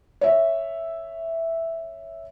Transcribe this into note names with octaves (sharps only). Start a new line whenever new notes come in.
C#5 E5